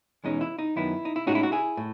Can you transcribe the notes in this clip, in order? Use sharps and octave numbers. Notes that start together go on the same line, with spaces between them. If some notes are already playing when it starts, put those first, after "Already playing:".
E2 B2 G#3 C#4 D#4
E4
D#4
F#2 D#3 F#3 B3 D#4 E4
D#4
E4
A2 G#3 C#4 D#4 F#4
E4
F#4
E4 G#4
A2